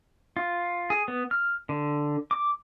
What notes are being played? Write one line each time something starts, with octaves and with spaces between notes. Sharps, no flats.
F4
G#4
B3
F6
D3
D6